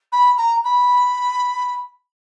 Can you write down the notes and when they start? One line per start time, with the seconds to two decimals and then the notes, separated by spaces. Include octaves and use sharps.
0.12 B5
0.38 A#5
0.64 B5